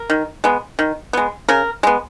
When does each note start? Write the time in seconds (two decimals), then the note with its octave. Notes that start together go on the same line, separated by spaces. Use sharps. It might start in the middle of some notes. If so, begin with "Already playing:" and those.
Already playing: A#4
0.10 D#3
0.44 G#3 B3
0.79 D#3
1.13 G#3 B3
1.49 C#3 A#4
1.83 G#3 B3